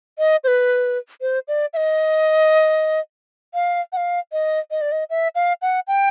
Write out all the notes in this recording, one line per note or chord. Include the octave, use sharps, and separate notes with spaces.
D#5
C5
B4
C5
D5
E5
D#5
F5
F#5
F5
D#5
D#5
D5
D#5
E5
F5
F#5
G5